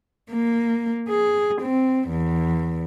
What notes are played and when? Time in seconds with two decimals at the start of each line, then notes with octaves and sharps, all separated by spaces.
0.31 A#3
1.09 G#4
1.62 C4
2.09 E2